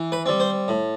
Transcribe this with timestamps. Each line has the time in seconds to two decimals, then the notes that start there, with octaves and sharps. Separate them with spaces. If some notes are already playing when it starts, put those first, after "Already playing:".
Already playing: E3
0.12 B4
0.26 G3 C4
0.40 C5
0.68 A2